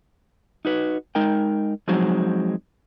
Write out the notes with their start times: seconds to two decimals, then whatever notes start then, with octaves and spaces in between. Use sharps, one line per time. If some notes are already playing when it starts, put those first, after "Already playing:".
0.65 D#4 F#4 B4
1.15 G#3 D#4 A#4 G5
1.88 F3 F#3 G#3 C4 D#4 F#4